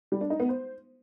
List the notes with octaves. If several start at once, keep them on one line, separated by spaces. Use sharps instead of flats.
G3
D4
D#4
B3
C5